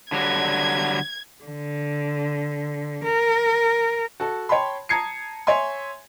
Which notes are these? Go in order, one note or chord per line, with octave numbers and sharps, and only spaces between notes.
D3 F#3 G3 G#6
D3
A#4
F#4 A4 A5
C#5 G5 A5 B5 C6
A5 A#5 D#6 G#6 C7 C#7
C#5 E5 G#5 C6